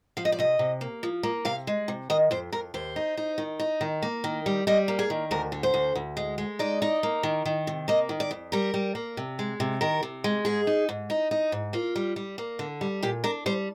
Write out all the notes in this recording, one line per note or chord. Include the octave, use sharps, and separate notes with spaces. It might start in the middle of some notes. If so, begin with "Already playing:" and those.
F3 F5
D#5
D5
C3 D#5
C3
A#3
F3
A#3
C3 F5
G#3
C3
D#3 D#5
F2 C5
F2 A#4
D#2 C5
D#4
D#4
D#3
D#4
D#3
A#3
D#3
G3
G3 D#5
A#3
G#4
D#3
D2 A#4
D3
C5
D2
D2
G#3
G#3
D#4 D5
D#4
A#3
D#3
D#3
C3
A#3 D#5
D#3
D5
F2
G3 A#4
G3
A#3
C3
G#3
C3
D#3 A#4
C3
G#3
G#2 G#4
D#4
G#2
D#4
D#4
G#2
A#3 F4
G3
G3
A#3
D3
G3
A#2 G4
D4 A#4
G3 C5